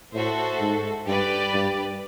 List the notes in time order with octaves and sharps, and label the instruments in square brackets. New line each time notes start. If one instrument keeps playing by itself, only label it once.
[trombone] A2 [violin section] F#4 A4 C5 E5
[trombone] G#2
[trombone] G2 [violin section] G4 B4 D5
[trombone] G2